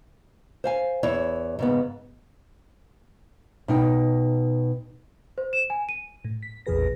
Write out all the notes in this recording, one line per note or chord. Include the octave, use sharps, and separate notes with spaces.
C5 F5 G#5
E2 E4 C#5 E5
G#2 C#3 B3
B2 D#4 G5
C5
E7
G#5
D#7
A2
B6
A1 E2 A#2 G#4 B4 A#6